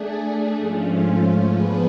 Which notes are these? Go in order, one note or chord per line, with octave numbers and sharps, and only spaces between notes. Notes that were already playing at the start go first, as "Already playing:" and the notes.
Already playing: A3 D4 G#4
G#2 F3 A3 C#4 F4
F3 B3 D4 G#4 B4